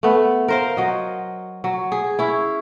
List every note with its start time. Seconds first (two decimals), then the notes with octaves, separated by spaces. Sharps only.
0.03 A3 B3
0.48 A#4 C5 F5
0.77 F#3 D#5
1.64 F#3
1.92 G#4
2.19 C#4 E4